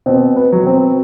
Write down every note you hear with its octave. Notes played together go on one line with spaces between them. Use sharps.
B2 C4
B3
F#3
C4